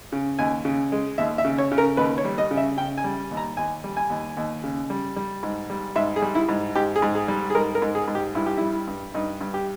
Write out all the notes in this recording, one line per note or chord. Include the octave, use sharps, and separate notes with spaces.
C#3
D#2 G#5
C#3
G#3
D#2 E5
E5
C#3
C#5
C#3
A#4
D#2 B4
C#5
G3
D#5
C#3
E5
C#3 G5
G#5
G3
D#2
A#5
D#2 G#5
G3
G#5
D#2
D#2
C#3
G3
G3
G#2
G3
G#2 E5
G#4
G3
E4
G#2
G#2 G4
G#4
G#2
G#4
G3
G#4
G#2 A#4
A#4
G#2
G#4
G#2
G4
G2 E4
G4
G3 E4
G2
G2 D#4
G2
G4